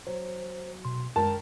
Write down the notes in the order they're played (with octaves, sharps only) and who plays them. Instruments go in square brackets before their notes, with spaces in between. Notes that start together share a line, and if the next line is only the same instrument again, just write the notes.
[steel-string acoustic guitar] F#3 [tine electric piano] C5
[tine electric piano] B2 C6
[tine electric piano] F#2 G#3 [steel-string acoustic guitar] D#3 A#4 [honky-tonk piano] A5